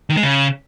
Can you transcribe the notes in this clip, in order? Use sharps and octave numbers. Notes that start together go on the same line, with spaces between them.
D#3
G#3
C#3